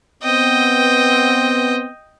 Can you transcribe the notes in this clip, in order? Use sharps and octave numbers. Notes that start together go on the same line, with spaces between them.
B3 C4 D#5 G5